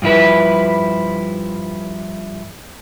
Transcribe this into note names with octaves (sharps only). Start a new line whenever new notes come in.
G2 F3 E4 B4